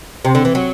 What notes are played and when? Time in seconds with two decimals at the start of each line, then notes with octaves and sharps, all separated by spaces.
0.25 C3
0.35 D3
0.45 E3
0.55 F#3